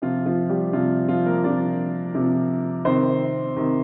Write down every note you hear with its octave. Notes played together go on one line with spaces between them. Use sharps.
C3 F3 F4
F3 F4
G3 G4
C3 F3 F4
F3 F4
A#3 A#4
C3 F3 D4 D5
C3 F3
C3 D#3 C4 C5
C3 D#3